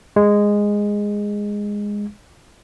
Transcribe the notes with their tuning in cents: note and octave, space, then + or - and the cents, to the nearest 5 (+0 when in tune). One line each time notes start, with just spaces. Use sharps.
G#3 -10